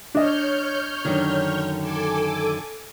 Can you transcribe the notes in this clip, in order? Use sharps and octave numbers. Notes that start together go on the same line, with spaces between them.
D4 C#5 D#5 F6 G6
F#2 D3 D#3
A4 G#5 D6